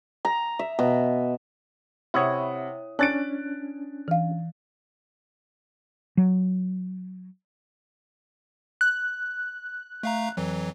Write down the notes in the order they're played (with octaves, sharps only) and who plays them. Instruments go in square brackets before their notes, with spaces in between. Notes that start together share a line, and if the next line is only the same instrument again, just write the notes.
[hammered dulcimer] A#5
E5
B2
[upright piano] C3 F#5 D#6 [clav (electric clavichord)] E4 C#5
[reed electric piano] C#4 D4 [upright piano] F#6 A6 D7
[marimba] E3 F5
[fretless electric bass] F#3
[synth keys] F#6
[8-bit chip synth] A3 F5 A#5
F2 E3 F#3